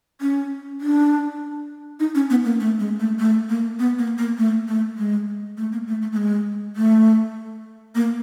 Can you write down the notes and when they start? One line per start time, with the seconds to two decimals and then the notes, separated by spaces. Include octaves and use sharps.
0.21 C#4
0.81 D4
2.00 D#4
2.15 C#4
2.30 B3
2.45 A#3
2.60 A3
2.79 G#3
3.00 A3
3.19 A3
3.49 A#3
3.79 B3
3.99 A#3
4.18 A#3
4.38 A3
4.68 A3
4.98 G#3
5.57 A3
5.72 A#3
5.87 A3
6.02 A3
6.12 A3
6.17 G#3
6.76 A3
7.95 A#3